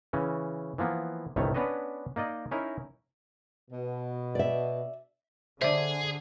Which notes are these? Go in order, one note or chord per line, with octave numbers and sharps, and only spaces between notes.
C#3 E3 C#4
E3 F3 A#3 B3
G1 C2 D#3 G3 A3 C#5
B3 C#4 D4 B4 C#5 D#5
A#3 D#4 D5 D#5
C#4 D#4 E4 A#4
B2
D5 E5
D3 G#4 C5 D5 E5